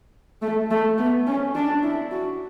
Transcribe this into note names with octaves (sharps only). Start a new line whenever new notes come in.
A3
A3
B3
C#4
D4
E4
F#4